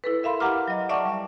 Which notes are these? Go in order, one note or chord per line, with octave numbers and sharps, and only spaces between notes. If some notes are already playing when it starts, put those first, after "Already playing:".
E4 A4 B4
A#4 E5 F5 B5 C6
G4 F#5 A#5 D6 F6
F#3 D#5
D5 E5 F#5 A5 C#6 D6
G3